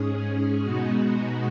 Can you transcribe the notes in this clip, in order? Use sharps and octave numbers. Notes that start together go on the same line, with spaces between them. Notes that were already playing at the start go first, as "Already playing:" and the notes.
Already playing: G#2 G#3 C#4 G#4
B2 G#3 B3 D#4 F#4